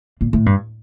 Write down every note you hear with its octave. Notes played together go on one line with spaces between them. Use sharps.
A#2
A2
G2